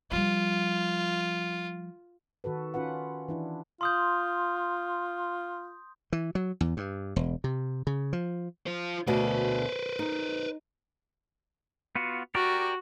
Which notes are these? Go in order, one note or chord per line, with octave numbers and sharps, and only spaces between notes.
F3 G3 F4
D#3 F#4 A4 B4
C#4 F4 B4 F#5
E3 D4 E4
F4 C6 D#6 G6
E3
F#3
E2
G2
E1
C3
C#3
F3
F4 C5
D2 B2 B4 C5
D#4
B3 F4 F#4
F#4 G4 A#4 D5